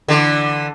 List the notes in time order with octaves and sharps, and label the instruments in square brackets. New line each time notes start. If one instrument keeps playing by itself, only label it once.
[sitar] D3 E3